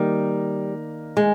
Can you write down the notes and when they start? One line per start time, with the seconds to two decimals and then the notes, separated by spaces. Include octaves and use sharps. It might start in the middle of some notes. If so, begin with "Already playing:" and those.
Already playing: D#3 G3 A#3 D#4 A#4
1.17 G#3